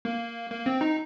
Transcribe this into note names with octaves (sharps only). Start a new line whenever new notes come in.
A#3
A#3
C4
D#4